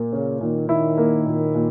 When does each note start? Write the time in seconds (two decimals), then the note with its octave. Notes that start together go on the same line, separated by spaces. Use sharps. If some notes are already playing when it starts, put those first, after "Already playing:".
Already playing: A#2 A#3
0.12 C#3 C#4
0.41 A#2 D#3
0.69 D#3 E4
0.98 A#3
1.26 A#2
1.54 A#2